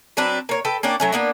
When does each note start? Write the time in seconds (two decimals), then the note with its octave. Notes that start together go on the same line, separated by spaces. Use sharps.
0.17 F#3 C4 D4 B4
0.49 A#3 C#5
0.65 A4 B4 G5
0.83 A#3 C#4 D4 G5
1.00 F#3 A3 C#4
1.12 A#3 B3 D4